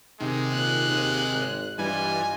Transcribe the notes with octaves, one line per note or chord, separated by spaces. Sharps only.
C3 D#3 G#3
A#2 F#6
D#2
G#1
G2 E3 G3 F4 D#5 G#5